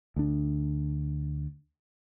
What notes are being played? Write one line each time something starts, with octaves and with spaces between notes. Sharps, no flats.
D2 D4